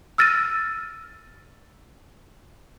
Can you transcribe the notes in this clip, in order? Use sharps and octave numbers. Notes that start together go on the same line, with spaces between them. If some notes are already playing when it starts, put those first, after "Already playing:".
E6 F6 A6 A#6 D#7